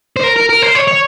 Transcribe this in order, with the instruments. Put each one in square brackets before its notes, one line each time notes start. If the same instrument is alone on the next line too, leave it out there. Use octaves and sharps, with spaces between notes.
[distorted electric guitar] C5
A#4
A#4
A#4
C5
C#5
C#5